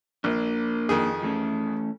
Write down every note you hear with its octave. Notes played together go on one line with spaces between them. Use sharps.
A#1 A#3 D4
F2 D#3 G#4
E3 A3 C#4